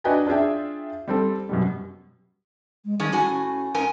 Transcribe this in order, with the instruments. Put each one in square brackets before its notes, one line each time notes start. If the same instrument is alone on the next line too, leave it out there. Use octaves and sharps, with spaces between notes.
[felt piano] D4 F#4 B4 D#5 G5 G#5
D4 F4 G#4 E5 G5
G3 C4 A4
F#2 B2 G3
[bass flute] G#3
[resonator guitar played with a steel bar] D#3 C#4 G#4 [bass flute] G3
[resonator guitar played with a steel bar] A2 F#4 G#5 [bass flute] C#4
[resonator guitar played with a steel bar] G#2 A#4 G#5